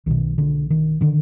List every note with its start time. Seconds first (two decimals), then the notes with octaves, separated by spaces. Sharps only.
0.06 B1 B2 D#3
0.38 D3
0.70 D#3
1.01 D3 D#3